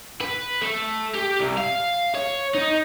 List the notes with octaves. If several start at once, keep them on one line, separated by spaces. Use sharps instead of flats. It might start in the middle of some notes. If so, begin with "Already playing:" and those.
B4
A3
G4
C2
F5
C#5
D#4